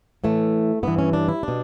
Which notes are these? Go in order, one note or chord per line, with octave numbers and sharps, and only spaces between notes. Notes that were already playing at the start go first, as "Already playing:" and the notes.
A2 E3 A3
G2 E3 B3
C#4
D4
E4
B2 D4